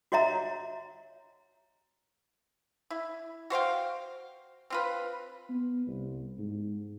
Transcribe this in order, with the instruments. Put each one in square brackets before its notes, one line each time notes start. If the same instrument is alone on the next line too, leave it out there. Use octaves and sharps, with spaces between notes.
[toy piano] F#4 C#5 D#5 E5 A#5
[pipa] E4
F#4 C5 F5 G5
C4 F4 B4
[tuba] B3
C2
G#2